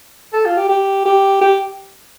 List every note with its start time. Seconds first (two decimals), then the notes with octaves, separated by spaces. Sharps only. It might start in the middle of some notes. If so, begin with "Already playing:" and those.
0.33 A4
0.45 F4
0.57 G4
0.69 G4
1.06 G4
1.41 G4